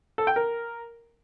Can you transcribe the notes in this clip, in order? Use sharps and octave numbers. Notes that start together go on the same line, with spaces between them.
A4
G5
A#4